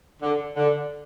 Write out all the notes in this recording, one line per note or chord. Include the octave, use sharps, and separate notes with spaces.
D3
D3